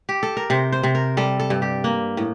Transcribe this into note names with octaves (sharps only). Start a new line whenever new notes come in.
G4
A4
A#4
C3 C5
C5
C3
A#4
G3 A4
A4
G2
G4
A#3
A2